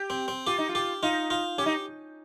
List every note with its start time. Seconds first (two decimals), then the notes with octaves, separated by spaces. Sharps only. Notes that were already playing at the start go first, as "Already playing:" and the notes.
Already playing: G4
0.10 C4
0.28 C4
0.47 F4 G4
0.58 D#4
0.69 F4
0.75 G4
1.03 D#4 F4
1.30 F4
1.58 C#4 G4
1.66 D#4